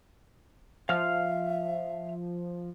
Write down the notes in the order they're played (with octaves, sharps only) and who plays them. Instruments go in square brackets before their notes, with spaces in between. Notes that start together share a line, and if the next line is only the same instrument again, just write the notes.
[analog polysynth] F3 [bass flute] E5 [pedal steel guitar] F5 F6